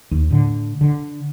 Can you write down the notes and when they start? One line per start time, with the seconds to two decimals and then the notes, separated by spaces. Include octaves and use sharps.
0.11 D#2
0.31 A2 D3
0.81 D3